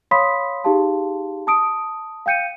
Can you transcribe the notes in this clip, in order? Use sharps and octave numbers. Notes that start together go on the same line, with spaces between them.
C#5 F5 B5 C6 D#6 B6
D#4 G4 G#4 F5 A5 C6
A5 D#6 D7
F5 G5 G6 C#7 D#7